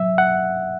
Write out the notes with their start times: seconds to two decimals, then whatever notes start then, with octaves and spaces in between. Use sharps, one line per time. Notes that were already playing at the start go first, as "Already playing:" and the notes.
Already playing: F#3 E5
0.18 F#5